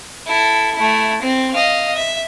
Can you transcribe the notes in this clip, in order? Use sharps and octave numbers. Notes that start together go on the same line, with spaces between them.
E4 A4
A3 E4
C4
D#5 F5
E5